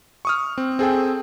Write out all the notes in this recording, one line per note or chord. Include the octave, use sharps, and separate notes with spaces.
C#6 D#6 F6
C4
C4 G#4 A4 G5